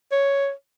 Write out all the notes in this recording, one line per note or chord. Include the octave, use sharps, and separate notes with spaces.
C#5